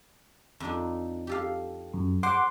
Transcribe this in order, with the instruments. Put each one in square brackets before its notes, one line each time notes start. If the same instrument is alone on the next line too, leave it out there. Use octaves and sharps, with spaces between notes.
[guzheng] F2 D4 D#4
G4 A4 F5
[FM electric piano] F#2
[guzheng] C5 [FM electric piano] F#5 C6 D6